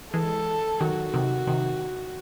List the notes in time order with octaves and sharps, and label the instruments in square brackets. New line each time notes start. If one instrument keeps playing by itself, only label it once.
[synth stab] E3 G#3 [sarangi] A4
[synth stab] D#3 F#3 [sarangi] F#4
[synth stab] C3 D#3
C3 D#3